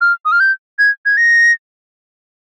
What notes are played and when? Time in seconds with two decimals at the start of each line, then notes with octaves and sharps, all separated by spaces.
0.01 F6
0.25 D#6
0.32 F6
0.40 G6
0.79 G#6
1.06 G#6
1.17 A#6